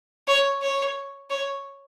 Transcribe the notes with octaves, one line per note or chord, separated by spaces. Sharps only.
C#5
C#5
C#5